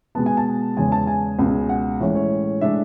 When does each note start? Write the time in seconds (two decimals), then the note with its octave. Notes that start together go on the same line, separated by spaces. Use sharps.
0.15 B2 G#3 B3 A5
0.26 G#5
0.37 A5
0.77 E2 C#3 G#3 G#5
0.92 A5
1.07 G#5
1.39 C#2 B2 G#3
1.69 F#5
2.00 A2 E3 G#3 C#4
2.15 C#5
2.61 A2 G#3 D4 E5